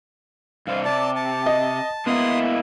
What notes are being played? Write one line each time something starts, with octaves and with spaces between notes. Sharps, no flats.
G2 C3 C5 F5
C3 D5 A5
A5
D#5
G#3 A#3 B3 E4 C6 D#6